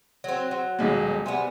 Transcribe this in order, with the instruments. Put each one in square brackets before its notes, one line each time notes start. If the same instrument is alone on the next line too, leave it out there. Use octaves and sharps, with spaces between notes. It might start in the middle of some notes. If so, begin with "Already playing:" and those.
[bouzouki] F#3 C4
F#3
[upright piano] D#1 B1 G#3
[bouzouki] C3 G3 B3 [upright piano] G#5